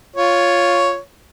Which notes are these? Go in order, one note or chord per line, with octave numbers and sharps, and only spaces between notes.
F4 C#5